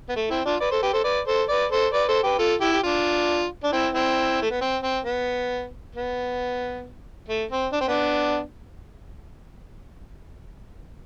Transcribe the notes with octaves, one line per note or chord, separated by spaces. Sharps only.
B3
A3
C4 E4
D4 F4
B4 D5
A4 C5
G4 B4
A4 C5
B4 D5
A4 C5
B4 D5
A4 C5
B4 D5
A4 C5
G4 B4
F4 A4
E4 G4
G4
D4 F4
D4
C4 E4
C4 E4
A3
B3
C4
C4
B3
B3
A3
C4
D4
C4
B3 D4